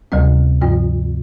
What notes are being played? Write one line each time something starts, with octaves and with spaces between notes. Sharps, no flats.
D2 C3 G3 C4
G2 F3 C4 F4